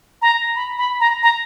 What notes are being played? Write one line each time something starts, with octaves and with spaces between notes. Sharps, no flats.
A#5
B5
B5
A#5
A#5